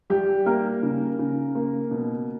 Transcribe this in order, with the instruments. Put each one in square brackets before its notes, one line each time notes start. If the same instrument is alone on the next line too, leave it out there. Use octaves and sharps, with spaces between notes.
[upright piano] G3 G4
A#3 A#4
C#3
C#3
A#3
B2